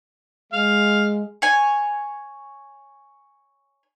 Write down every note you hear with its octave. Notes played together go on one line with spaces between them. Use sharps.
G#3 F5
C#5 G#5